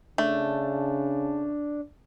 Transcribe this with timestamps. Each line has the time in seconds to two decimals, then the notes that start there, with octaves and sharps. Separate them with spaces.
0.18 C#3 A3 D4